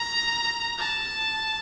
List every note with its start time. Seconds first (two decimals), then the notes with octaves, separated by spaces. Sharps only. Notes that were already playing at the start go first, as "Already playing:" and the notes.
Already playing: A#5
0.79 A5